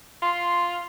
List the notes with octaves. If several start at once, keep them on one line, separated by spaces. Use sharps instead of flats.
F4 C6